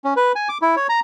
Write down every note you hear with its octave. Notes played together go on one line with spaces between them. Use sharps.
C#4
B4
G#5
D6
E4
C#5
A#5